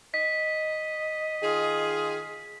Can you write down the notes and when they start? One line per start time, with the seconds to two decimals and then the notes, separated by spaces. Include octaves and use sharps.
0.14 D#5 B6
1.42 D#3 F4 G#4